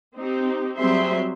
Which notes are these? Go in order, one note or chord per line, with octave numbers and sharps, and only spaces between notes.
C4 D#4 G4
F#3 G3 C4 G#4 E5 C6